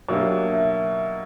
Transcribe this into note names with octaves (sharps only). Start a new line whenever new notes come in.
B2 F#3 A#3 D4 G4 E5
E5